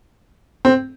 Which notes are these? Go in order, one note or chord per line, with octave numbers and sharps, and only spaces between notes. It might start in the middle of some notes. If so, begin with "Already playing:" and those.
C4